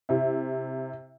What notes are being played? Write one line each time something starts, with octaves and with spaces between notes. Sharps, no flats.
C3 E4